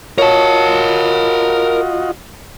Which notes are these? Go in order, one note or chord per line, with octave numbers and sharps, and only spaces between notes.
F4 F#4 A#4 C#5 D#5 A5